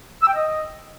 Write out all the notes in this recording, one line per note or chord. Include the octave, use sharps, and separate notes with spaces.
E6
G5
D#5